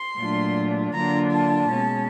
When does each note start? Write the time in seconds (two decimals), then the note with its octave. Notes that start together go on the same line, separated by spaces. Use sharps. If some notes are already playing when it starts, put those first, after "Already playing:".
Already playing: C6
0.18 A#2 F#3 A3 D4 F4
0.93 D3 F#3 A#3 D4 F4 A#5
1.32 A5
1.70 B2 G#3 C#4